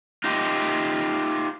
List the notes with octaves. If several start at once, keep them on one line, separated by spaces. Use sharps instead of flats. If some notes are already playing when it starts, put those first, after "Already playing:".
D#4 F4 G4